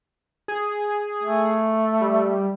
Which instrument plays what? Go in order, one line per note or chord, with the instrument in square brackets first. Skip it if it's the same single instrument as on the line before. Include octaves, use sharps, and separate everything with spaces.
[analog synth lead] G#4
[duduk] A3
[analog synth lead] G3